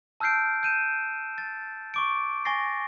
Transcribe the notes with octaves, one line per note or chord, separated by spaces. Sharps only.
A5 E6 F6 G6 C7 D7
G6 D#7 E7
A6
C#6 D6 D7
G#5 C#6 A6 A#6 C7